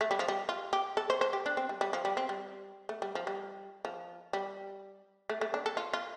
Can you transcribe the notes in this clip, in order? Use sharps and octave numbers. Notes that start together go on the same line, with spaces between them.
A3
G3
F3
G3
F4
G4
A4
C5
C5
G4
D4
C4
G3
G3
F3
G3
C4
G3
A3
G3
F3
G3
F3
G3
A3
A3
D4
A4
F4
F4